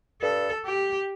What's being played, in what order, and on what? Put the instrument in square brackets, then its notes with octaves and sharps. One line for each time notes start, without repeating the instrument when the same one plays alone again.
[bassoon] G2 [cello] A4
[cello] G4